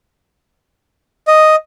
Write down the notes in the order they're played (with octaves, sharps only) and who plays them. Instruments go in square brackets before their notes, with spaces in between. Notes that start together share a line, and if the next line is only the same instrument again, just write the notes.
[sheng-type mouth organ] D#5